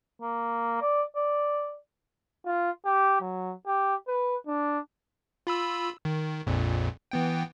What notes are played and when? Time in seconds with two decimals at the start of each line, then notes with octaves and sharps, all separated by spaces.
0.22 A#3
0.81 D5
1.16 D5
2.46 F4
2.86 G4
3.21 F#3
3.67 G4
4.08 B4
4.47 D4
5.47 F4 B5 E6
6.05 D#3
6.47 A#1 F2 A#2
7.11 E3 B3 G5